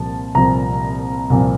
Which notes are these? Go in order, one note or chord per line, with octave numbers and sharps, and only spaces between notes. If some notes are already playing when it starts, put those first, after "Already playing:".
Already playing: C2 A#2 F3 A5
C2 A#2 F3 A#5
C2 A#2 F3